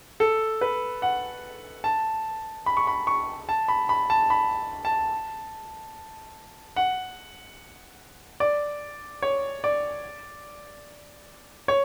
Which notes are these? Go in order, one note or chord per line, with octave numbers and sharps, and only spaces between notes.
A4
B4
F#5
A5
B5
C#6
B5
C#6
A5
B5
B5
A5
B5
A5
F#5
D5
C#5
D5
C#5